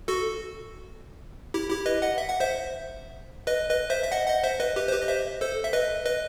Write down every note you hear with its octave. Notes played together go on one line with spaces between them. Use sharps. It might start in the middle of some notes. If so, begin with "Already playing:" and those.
F#4 A4
E4 G4
E4 G4
B4 D#5
D#5 F#5
E5
F#5
C5 E5
B4 D#5
B4 D#5
C5 E5
E5
D#5 F#5
D#5 F#5
C5 E5
B4 D#5
G4 B4
C5
G4 B4
D#5
C5 E5
A4 C5
E5
B4 D#5
B4 D#5